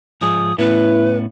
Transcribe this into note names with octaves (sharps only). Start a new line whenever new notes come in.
G#2 F3 G#4 D#6
A2 B3 C#4 E4 B4